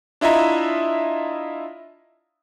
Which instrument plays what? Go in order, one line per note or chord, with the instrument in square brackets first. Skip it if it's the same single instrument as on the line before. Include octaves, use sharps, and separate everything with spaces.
[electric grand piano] D4 E4 F4 D#5 E5 A#5